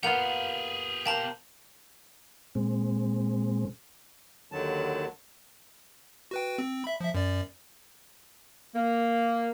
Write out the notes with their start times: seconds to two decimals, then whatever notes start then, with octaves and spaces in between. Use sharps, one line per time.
0.03 A#3 B3 F4 G4 G#4 F#5 F7
1.06 B2 A#3 G4 C5 G5 A5 A#5 F#7
2.55 A#2 G#3 C4
4.52 D#2 D3 D#3 F#3 A5
6.31 F#4 B4 G5
6.58 C4
6.84 E5 B5
7.00 F3 E5
7.14 F#2 D5
8.75 A#3